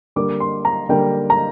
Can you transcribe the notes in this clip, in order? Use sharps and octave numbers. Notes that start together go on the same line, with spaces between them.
D3 G3 A#3 D6
C6
A#5
D3 G3 A#3 G5
A#5